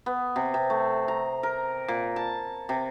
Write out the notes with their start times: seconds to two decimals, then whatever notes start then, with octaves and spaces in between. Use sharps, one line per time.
0.06 B3
0.36 C3
0.54 C3
0.70 A3
1.08 A#5
1.43 A#4
1.88 A#2
2.16 A5
2.69 C3